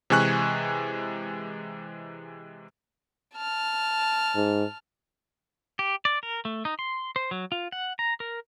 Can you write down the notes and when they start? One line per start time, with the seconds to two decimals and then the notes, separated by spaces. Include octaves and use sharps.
0.10 C3 E3 G#3 G#5 C#6 F#6
3.35 A5 F6
4.35 G#2
5.79 G4
6.05 D5
6.23 A#4
6.45 A3
6.65 D#4
6.79 C6
7.16 C5
7.31 F#3
7.52 F4
7.72 F#5
7.99 A#5
8.20 A#4